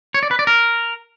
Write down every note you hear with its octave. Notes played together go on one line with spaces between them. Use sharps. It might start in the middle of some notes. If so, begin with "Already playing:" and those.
C#5
D5
B4
D5
A#4